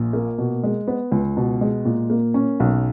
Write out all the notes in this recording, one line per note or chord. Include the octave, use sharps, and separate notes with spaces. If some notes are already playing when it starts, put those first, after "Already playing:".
Already playing: A#1 A#2
A#3
B2
G#3
B3
C#2
B2
G#3
A#2
A#3
C#4
B1